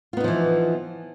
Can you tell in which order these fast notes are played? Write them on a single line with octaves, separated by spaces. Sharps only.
F4 B3 D#4 F3 E3